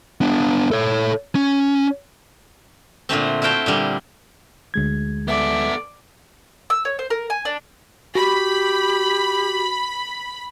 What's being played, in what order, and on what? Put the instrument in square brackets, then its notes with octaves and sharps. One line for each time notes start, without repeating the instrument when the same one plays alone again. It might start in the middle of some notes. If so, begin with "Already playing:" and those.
[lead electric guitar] B3 D4
A4 C#5
C#4
[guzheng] A#2 D3 A3 C4
E4 F#4 F5 G5 A5
A#2 D3 G3
[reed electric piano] D2 G#3 G#6
[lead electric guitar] B3 A4 [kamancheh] D5 [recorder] E5
[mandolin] E6
C#5
C5
A#4
G#5
D4
[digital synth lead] F#4 [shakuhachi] G4 [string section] B5